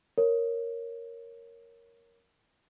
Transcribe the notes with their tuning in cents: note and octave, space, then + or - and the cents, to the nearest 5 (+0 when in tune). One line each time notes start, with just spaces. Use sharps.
A#4 +0 C#5 +0